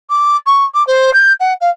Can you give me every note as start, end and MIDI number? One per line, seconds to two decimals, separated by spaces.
0.10 0.36 86
0.47 0.64 85
0.74 0.86 86
0.87 1.13 72
1.14 1.33 91
1.40 1.54 78
1.61 1.70 77